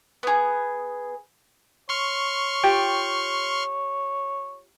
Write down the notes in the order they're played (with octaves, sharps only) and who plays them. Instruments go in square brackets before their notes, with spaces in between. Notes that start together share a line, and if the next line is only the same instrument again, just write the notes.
[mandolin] B3 G#4
[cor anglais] C#5 [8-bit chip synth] C6 C#6 F6
[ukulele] F4 G4 G5